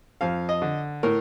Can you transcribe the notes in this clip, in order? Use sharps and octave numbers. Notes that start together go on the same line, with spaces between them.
F2 F5
D#5
D3
A2 A#4